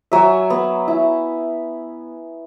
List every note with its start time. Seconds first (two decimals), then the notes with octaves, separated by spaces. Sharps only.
0.12 F#3 E5 G#5
0.50 B3
0.88 E4